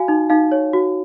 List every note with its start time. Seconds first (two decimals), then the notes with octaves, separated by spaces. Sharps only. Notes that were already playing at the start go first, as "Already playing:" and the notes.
Already playing: F#4 F5 G#5
0.08 D#4
0.30 D#4 F5
0.52 C#5
0.73 F#4